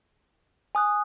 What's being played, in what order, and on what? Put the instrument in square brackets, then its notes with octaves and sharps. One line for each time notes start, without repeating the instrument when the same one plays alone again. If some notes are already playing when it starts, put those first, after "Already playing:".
[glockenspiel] G#5 D#6 F#6